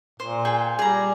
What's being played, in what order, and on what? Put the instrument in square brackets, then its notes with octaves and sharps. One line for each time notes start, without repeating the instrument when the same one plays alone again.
[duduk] A#2 [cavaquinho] C5
[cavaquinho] G#4 A4 G5
[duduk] G3 [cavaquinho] G#4 A#5